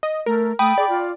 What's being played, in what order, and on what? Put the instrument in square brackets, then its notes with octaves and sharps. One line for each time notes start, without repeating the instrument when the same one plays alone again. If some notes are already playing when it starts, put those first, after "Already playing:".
[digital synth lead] D#5
[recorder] A3 [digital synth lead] A#4
[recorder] A3 [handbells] G5 B5 [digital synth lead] D#6
[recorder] G#4 [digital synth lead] D5
[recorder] F4